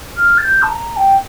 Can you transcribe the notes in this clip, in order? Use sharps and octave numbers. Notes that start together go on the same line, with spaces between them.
F6
A6
G6
A5
A#5
G5